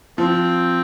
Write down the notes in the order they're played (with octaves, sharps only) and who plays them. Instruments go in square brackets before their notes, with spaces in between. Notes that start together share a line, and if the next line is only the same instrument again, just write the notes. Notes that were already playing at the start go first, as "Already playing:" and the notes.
[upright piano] F3 [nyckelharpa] C4